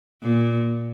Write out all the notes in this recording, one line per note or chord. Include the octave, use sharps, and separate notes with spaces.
A#2